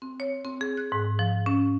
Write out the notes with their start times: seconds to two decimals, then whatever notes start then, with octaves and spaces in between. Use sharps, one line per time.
0.02 C4
0.20 C#5
0.45 C4
0.61 G#4
0.77 F#6
0.92 G#2
1.19 F3
1.46 C#4